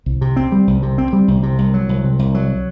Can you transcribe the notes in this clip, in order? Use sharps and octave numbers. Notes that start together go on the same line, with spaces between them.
C2
C3
C4
G3
C2
C3
C4
G3
C2
C3
C2
F#3
C2
C3
C2
F#3